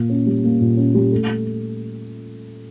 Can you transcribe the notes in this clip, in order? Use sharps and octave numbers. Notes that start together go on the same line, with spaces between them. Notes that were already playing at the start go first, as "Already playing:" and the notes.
Already playing: A#2 A#3
C#4
G3
A#3
A#2
C#4
G3
A3